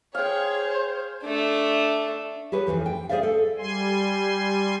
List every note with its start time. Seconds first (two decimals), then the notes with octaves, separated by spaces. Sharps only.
0.15 G#4 C5 C#5 F5 G5
1.23 A3 D4
2.52 G4 G#4 B4 C#5
2.67 F2 A#2 E3 F3
2.86 G5
3.09 G#4 A4 C5 D5 E5 F5
3.23 A4
3.58 G3 G#5 C6